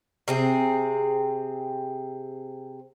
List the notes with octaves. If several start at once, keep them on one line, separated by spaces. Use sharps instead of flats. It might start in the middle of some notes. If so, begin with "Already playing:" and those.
C3 C4 G#4